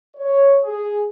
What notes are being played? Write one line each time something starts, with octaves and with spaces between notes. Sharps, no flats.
C#5
G#4